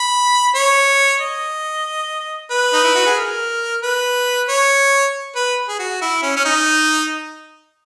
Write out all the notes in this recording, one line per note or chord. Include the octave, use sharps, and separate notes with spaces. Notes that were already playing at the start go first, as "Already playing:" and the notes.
Already playing: B5
C#5
D#5
B4
D#4
E4
F#4
G#4
A#4
B4
C#5
B4
G#4
F#4
E4
C#4
C#4
D#4